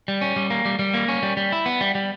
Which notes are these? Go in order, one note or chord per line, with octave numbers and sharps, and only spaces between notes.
G3
C#4
G3
A#3
G3
G3
A#3
C#4
G3
G3
E4
B3
G3
G3